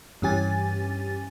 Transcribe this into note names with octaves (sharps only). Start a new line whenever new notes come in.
G2 E3 C#4 G4 G#5 A6